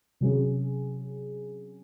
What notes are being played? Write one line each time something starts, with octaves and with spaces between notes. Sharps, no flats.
C3 F#3 C#4 G#4